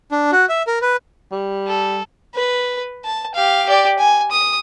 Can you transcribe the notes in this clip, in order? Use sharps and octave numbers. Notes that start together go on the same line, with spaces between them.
D4
F#4
E5
A#4
B4
G3
A4
B4
A5
G4 F5
G4 D5
G#5
D#6